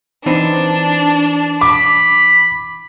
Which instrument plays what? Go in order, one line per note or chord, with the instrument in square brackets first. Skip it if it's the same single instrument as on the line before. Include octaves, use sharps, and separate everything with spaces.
[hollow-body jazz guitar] E3 C4 D#4 [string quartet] D4
[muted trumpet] B5 [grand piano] D6